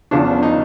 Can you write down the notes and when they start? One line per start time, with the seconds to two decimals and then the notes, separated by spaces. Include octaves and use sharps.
0.11 E2 C#3 F3 D4
0.43 D#4